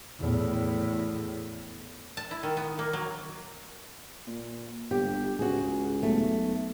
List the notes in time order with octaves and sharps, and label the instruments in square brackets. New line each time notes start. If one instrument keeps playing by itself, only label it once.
[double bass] E2 A2
[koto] A5
E4
D#3
B3
A#3
F#3
[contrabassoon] A#2
[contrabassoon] G1 [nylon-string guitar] G4
[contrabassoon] C#2 [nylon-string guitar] F#4 G#4
[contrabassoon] B1 [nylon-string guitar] A3